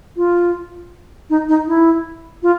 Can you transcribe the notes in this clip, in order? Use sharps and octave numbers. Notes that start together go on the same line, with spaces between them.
F4
D#4
D#4
E4
F4